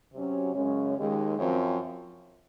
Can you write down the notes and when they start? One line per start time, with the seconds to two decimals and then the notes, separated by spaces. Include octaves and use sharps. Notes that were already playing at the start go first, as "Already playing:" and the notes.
0.13 C3 F#3 C#4
0.54 F#2 C#3 G#3 C#4
0.96 D#2 D#3 G#3
1.38 F#2 F3 C4